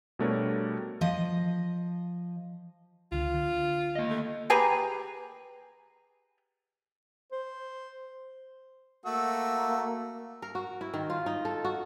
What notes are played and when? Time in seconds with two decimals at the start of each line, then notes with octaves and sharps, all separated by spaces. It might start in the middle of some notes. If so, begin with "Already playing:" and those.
0.19 B2 G3 A3 D4 A#4 C#5
1.01 F3 D#5
3.12 C#2 D3 F4
3.34 D3
3.96 A#3 D#5
4.10 A3
4.50 G4 G#4 B4 A#5
7.32 C5
9.06 A3 A#3 F#4 E6
10.42 A#4
10.55 F#4
10.81 E4
10.94 D#3
11.10 F4
11.26 D#4
11.45 A4
11.65 F#4